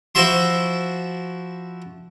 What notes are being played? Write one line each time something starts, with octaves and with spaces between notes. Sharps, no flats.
F3 E4 F#4 E5 C6